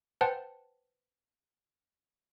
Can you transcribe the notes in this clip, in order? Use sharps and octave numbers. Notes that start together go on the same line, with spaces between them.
B4 C5 F#5 G5 A5